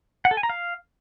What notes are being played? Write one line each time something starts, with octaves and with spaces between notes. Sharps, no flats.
F#5
A4
G#5
A#5
F5